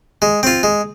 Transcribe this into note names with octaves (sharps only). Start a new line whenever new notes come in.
G#3
C4 F4
G#3